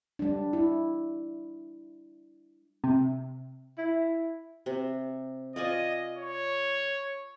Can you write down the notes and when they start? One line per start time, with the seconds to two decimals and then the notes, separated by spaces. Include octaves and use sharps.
0.19 G3 D4
0.53 E4
2.84 C3
3.78 E4
4.66 C3
5.56 F4 D5 D#5 G#5
6.17 C#5